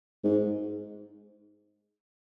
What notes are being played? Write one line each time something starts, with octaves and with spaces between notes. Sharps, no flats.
G#2